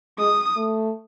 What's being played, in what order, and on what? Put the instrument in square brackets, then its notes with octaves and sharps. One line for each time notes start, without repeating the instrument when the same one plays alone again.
[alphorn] G#3 [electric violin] D#6
[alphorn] A3